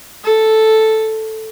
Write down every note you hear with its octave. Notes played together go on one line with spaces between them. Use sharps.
A4